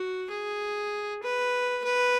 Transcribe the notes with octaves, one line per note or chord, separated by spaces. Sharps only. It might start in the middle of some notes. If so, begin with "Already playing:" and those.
Already playing: F#4
G#4
B4
B4